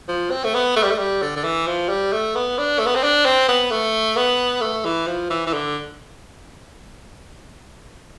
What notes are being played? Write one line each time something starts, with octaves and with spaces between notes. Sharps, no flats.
F3
C4
A3
B3
A3
G3
A3
G3
D3
D3
E3
F3
G3
A3
B3
D4
A3
B3
C4
D4
C4
B3
A3
B3
A3
E3
F3
E3
E3
D3